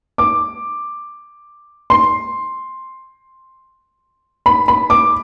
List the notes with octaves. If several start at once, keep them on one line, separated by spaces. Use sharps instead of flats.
D6
C6
B5
B5
D6